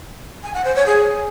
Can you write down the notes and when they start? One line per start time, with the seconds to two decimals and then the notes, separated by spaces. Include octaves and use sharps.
0.43 G#5
0.54 F#5
0.65 C5
0.75 C#5
0.86 G#4